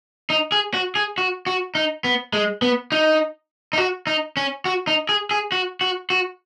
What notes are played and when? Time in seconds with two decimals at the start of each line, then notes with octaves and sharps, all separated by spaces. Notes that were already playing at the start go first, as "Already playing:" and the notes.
0.30 D#4
0.52 G#4
0.74 F#4
0.95 G#4
1.18 F#4
1.47 F#4
1.75 D#4
2.04 B3
2.33 G#3
2.62 B3
2.92 D#4
3.73 D#4
3.78 F#4
4.07 D#4
4.37 C#4
4.65 F#4
4.87 D#4
5.09 G#4
5.31 G#4
5.52 F#4
5.81 F#4
6.10 F#4